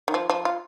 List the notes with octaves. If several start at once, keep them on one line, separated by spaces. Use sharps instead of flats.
D#3
F3
F3
F4